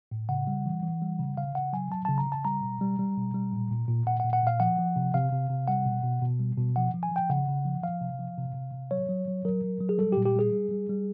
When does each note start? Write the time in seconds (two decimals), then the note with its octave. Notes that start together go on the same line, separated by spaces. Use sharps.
0.11 A2
0.29 C#3 F#5
0.47 G3
0.66 E3
0.83 E3
1.02 G3
1.19 C#3
1.37 C#3 F5
1.55 C#3 F#5
1.73 F#3 G#5
1.91 F#3 A5
2.05 C#3 A5
2.18 A#5
2.27 C#3
2.32 A5
2.45 G3 A#5
2.63 B2
2.81 G3
2.99 G3
3.17 B2
3.34 G3
3.53 A#2
3.71 A#2
3.88 A#2
4.06 A#2 F#5
4.20 F#5
4.24 A#2
4.33 F#5
4.43 A#2 F5
4.60 F3 F#5
4.79 F3
4.96 C3
5.14 C3 F5
5.32 C3
5.50 C3
5.67 G3 F#5
5.86 B2
6.03 B2
6.22 B2
6.39 G3
6.58 B2
6.76 F3 F#5
6.94 F3
7.03 G#5
7.11 F3 G5
7.30 C#3 F#5
7.48 C#3
7.65 F3
7.83 F3 F5
8.01 C3
8.19 F3
8.38 C3
8.55 C3
8.73 C3
8.91 F#3 C#5
9.09 F#3
9.28 F#3
9.45 F#3 A#4
9.64 F#3
9.81 F#3
9.89 G#4
9.98 G3 A4
10.12 G4
10.17 A#2
10.25 G4
10.35 G3 G#4
10.53 G3
10.71 G3
10.89 G3